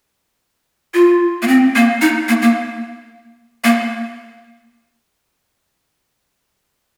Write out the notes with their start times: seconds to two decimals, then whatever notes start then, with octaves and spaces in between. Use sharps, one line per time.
0.94 F4
1.42 A#3
1.48 C4
1.76 A#3
2.02 D#4
2.29 A#3
2.42 A#3
3.64 A#3